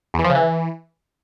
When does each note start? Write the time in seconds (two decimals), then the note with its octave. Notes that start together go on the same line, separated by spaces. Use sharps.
0.14 E2
0.19 E3
0.24 F3
0.30 C#3
0.35 E3